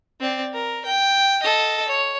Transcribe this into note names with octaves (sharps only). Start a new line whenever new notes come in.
C4 D5
A#4
G5
A4 D#5
C#5